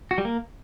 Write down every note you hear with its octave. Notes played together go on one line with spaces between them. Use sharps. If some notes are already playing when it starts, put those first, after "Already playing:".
F#4
G3
A#3